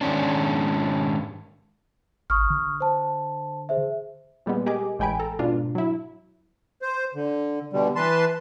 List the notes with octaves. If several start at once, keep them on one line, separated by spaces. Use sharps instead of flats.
G#2 D#3 C#4 D4
G#1 C#6 D#6 F6
D3
C5 A5
G#4 C5 E5
A#2 G3 G#3 B3
G4 G#4 A#4 D#5 G#5 D6
A1 G#3 G5 G#5 B5 D7
A4 A#5
G#2 B2 D4 F4
F#3 E4
C5
D3
B2 D3 G3
E3 B4 A5 C6